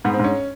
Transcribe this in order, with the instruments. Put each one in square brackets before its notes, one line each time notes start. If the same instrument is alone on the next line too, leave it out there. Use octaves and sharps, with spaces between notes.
[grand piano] G#2 [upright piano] B3
[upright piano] C4
[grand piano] G#2 [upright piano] C#4